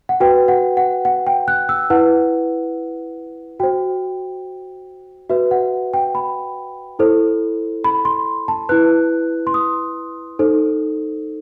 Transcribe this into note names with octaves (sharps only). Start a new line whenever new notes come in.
F#5
F#4 B4 G5
F#5
F#5
F#5
G5
F#6
E6
E4 B4 F#5
F#4 C5 G5
F#4 B4 E5
F#5
G5
B5
E4 A4 C5
B5
C6
A5
E4 B4 F#6
C6
D#6
D#4 A4 C5